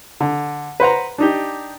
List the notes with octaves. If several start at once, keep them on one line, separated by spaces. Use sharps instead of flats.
D3
B4 C5 F#5 A#5
D4 D#4 G4